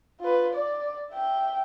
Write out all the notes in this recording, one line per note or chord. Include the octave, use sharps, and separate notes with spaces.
F4 B4
D5
E5 G5